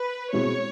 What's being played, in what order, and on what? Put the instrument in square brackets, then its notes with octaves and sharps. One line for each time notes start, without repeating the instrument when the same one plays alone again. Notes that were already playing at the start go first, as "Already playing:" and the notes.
Already playing: [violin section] B4
[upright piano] B2 G#3 C4 E4 [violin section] C#5